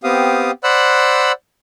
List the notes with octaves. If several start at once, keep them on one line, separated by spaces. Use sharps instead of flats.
B3 C4 G4 F5 D#6
C5 D5 F#5 B5 E6 F#6